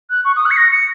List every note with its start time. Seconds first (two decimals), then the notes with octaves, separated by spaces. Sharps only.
0.10 F#6
0.25 C#6
0.36 D#6
0.45 F#6
0.51 C#7
0.57 A#6
0.72 C#7